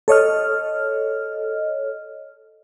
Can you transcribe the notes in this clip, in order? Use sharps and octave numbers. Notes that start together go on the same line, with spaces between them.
A4 C#5 D#5 F6